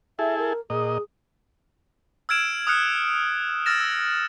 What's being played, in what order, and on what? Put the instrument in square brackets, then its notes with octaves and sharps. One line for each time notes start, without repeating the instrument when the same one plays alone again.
[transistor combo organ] E4 G#4 A4 [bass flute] E5
[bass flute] A#4
[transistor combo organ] A#2 D#5 [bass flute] G#4
[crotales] E6 F6 G#6 D7 E7
D#6 F6 F#6 C#7
E6 F6 A6 A#6 E7
E6